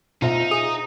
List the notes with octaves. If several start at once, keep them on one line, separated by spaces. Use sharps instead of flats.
B2 D#4 F4 C5 E5
G#4 D#6